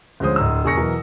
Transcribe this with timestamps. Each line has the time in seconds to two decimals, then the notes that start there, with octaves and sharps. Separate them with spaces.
0.20 D2 F3 G#3 C#4 C5 D#6
0.36 D1 A#5 E6
0.65 E1 G#4 A#4 C#6 A#6 C#7
0.77 B2 E3 F#3 A#4